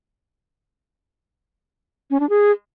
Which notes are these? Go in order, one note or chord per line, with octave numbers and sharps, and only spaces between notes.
C#4
D4
G#4